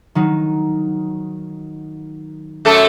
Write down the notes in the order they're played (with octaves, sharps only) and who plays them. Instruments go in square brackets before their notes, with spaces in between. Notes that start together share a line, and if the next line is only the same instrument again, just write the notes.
[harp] D#3 F#3 D#4
[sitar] F#2 A3 A4